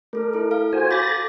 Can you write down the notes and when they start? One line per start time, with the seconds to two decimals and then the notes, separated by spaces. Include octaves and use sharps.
0.13 A3 A4 A#4
0.34 E4 A4
0.51 F5
0.73 F#4 C5 G#5
0.91 B5 D6 G6 A6 A#6
1.10 A4